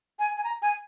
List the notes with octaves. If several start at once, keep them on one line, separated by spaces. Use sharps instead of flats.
G#5
G#5
A#5
G#5